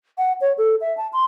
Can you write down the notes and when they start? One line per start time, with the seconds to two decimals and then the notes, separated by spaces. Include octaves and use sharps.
0.18 F#5
0.41 C#5
0.58 A4
0.81 E5
0.97 A5
1.13 C6